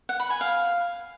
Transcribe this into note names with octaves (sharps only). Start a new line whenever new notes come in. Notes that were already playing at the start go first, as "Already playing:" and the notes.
F#5
B5
G#5
F5